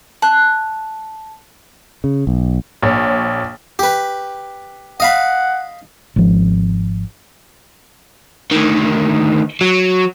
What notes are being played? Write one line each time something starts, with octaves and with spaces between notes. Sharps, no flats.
A5 F#6
C#3
B1
A#1 C#5
G4 B4
D#5 F5 F#5 B5
G#1 F3
D2 D#3
F#3